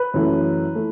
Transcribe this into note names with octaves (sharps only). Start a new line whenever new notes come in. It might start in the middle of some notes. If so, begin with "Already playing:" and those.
Already playing: B4
F#2 E3 A3
E3 A3